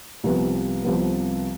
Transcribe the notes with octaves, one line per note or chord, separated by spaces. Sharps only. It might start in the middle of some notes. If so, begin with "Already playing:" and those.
C2 C3 F3 B3
C2 C3 F3 B3